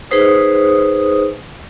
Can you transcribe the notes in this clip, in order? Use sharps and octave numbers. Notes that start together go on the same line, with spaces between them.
D#4 G#4 B4 C5 D#6